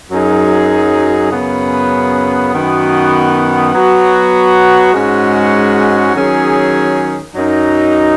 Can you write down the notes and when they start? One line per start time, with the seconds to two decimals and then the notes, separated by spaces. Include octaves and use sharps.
0.10 F#2 F#3 D#4 G#4
1.31 F#2 C#3 B3
2.52 F#2 D#3 B3 F#4
3.73 F#3 B3 F#4
4.93 G#2 G#3 C#4 F#4
6.15 D#3 F#3 C#4 G#4
7.35 F#2 F#3 D#4